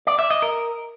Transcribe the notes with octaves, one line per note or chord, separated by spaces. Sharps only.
D5
E5
D#5
A#4